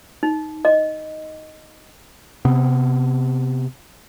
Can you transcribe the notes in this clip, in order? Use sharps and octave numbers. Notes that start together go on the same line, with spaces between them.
D#4
D#5
C3 B3 C4